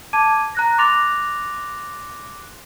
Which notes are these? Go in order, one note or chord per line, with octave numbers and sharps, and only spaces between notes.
A5 D6 G#6 D#7
A#5 F#6 A#6
C6 D6 F#6 A6 A#6 F7